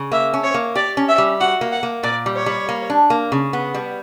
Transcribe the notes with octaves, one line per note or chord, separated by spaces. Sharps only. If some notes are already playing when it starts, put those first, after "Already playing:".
Already playing: C#3
A#3 E5
C#4
C#5
A#3
G4 D5
C#4
E5
G3
F#4 F#5
A#3
F#5
A#3
A#2 D5
G3
C#5
G3
A#3
D4
A#3
C#3
B3
G3